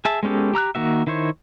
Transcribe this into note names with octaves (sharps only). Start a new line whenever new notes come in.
G#4 E5 A5
G#3 B3 C#4 G4 A4
G4 A#5 E6 F#6
D#3 A#3 F#4 E5
D#3 E4 C5 C#5